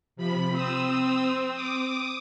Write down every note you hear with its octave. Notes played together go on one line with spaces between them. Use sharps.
C3 F3 B5
C4 D#6 E6
D6 D#6